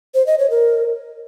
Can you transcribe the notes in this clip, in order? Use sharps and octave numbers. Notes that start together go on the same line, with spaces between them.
C5
D#5
C#5
A#4